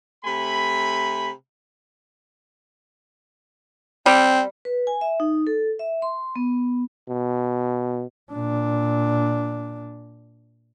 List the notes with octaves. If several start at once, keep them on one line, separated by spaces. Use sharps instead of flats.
C3 A3 G#5 B5
G3 C4
B4
G#5
E5
D#4
A4
E5
C6
B3
B2
A#2 D4